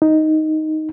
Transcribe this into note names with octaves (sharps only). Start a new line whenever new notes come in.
D#4